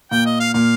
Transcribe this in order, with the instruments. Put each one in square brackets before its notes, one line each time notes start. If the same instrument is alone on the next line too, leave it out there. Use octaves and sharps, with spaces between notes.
[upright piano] A#2 [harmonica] G5
[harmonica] D#5
F5
[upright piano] A#2 [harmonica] F5